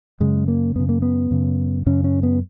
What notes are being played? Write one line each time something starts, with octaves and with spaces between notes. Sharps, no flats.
F#2 C#3 G#3
A#3
F#2 C#3 B3
A#3
B3
F#2 C#3
F#2 C#3 C#4
C#4
B3